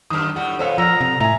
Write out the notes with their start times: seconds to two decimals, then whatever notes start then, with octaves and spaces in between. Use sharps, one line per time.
0.10 F#2 D#3 D#6 F6
0.36 A2 G3 F#5
0.59 A#2 B3 A4 C5 C#5 F5
0.78 F3 A#5 E6 F6
1.01 C3
1.20 A2 E5 G#5 A#5